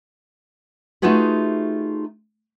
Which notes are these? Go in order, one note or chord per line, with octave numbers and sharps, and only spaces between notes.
A3 D#4 F4 F#4 G#4 B4